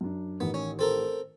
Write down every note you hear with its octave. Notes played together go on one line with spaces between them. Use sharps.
F#2 D4
A1 D#3 B3
C#4
C4 A4 A#4